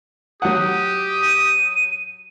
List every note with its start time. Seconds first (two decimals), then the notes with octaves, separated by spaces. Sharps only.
0.42 F#3 G4 F#5 D#6
1.22 D#7